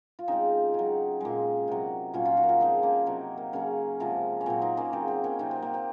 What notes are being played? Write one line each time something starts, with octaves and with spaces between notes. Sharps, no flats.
F4
C#3 G#3 C4 D#4
C#3 F#3
A#2 G#3
C3 F#3
A#2 F#3 C#4 F4
C#4 F4
D#4 F#4
A#4
F4 G#4
C#3 F3 G#3 C4 D#4
A#3 C#4
C3 F#3 C4
A#3
C#3 F#3 A#3 C#4
C3 F3 G#3
C#4
A#2 F#3 C4
C4 D#4
A#3 C#4
C#3 F#3 C4
C4
A#3 C#4
C3 F#3 C4 D#4
C4
A#3
C4